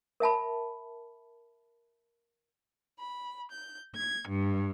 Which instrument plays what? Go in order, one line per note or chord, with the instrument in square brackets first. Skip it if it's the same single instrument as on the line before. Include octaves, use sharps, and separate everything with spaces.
[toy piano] A#4 E5 A5 B5
[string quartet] B5
G6
G#6
G2